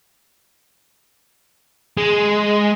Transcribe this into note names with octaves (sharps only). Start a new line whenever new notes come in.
G#3